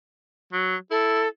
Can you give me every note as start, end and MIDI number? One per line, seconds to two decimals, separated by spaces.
0.53 0.76 54
0.91 1.26 64
0.91 1.28 69